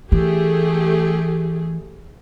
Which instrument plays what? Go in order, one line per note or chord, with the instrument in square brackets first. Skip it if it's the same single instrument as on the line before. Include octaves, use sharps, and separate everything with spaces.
[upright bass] E3 [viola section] A3 G4 G#4